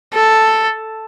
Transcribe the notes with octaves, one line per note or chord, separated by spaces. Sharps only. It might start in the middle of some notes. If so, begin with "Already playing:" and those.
A4